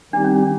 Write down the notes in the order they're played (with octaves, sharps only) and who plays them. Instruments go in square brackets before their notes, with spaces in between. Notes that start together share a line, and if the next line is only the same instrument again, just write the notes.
[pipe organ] D#3 G3 C4 D#4 G4 [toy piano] D4
[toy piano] C#4